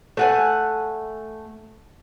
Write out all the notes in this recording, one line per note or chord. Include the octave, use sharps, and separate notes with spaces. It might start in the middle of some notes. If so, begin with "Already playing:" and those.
A3 F#5 G#5